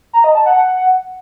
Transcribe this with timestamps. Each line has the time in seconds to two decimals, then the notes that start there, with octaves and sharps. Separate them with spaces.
0.13 A#5
0.24 D#5
0.35 A5
0.46 F#5